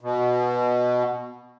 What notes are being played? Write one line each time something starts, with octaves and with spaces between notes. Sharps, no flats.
B2